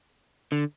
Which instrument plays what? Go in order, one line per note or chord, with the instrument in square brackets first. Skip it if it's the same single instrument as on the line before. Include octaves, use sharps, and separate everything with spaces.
[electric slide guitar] D3